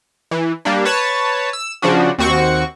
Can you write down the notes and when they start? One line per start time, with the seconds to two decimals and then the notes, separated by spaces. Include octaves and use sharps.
0.31 E3
0.65 G3 A#3 D4
0.85 B4 C#5 A5
1.53 E6
1.82 C#3 F3 D4 F#4
2.18 D#2 C4 F#4 C#6